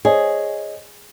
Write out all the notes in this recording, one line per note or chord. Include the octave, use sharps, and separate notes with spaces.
G#4 C5 C#5 D#5